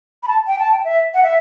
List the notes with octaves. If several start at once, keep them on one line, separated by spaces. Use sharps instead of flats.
B5
A5
G5
A5
G5
E5
F#5
E5